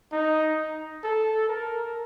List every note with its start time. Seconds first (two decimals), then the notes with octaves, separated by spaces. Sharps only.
0.13 D#4
1.04 A4
1.48 A#4